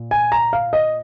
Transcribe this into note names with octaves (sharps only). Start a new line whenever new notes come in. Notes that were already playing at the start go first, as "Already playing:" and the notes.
Already playing: A#2
G#5
A#5
F5
D#5